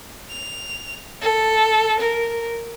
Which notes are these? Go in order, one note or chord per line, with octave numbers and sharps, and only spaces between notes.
F7
A4
A#4